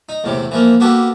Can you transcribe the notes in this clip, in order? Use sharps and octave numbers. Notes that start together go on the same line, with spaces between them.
D#4
E2 A2 C3
E3 F3 A#3
A#3 B3 F#4 G4 A4